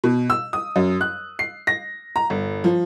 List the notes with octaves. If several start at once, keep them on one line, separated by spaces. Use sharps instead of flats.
B2
E6
D#6
F#2
F#6
C7
A#6
A#5
G1
F3